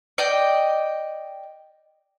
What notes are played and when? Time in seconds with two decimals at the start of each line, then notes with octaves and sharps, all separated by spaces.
0.18 D5 D#5 G5